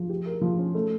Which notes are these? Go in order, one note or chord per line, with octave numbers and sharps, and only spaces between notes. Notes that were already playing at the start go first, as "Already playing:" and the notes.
Already playing: F3
G4
A#4
F3
C#4
A3